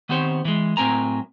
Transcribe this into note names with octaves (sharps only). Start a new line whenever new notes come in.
D#3 B3 C4 G4 C5 C#5
E3 G#3
A2 F#3 C4 A#4 G#5 A#5